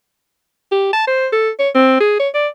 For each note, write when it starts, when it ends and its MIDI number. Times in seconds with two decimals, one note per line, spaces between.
0.72 0.90 67
0.93 1.05 81
1.07 1.27 72
1.32 1.50 69
1.59 1.69 73
1.75 1.95 60
2.00 2.16 68
2.20 2.29 73
2.34 2.48 74